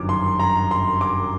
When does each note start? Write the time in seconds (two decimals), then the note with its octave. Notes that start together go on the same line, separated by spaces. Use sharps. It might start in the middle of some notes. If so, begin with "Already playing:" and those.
Already playing: G1 F#2 D#3 D6
0.09 C6
0.40 A#5
0.71 C6
1.01 D6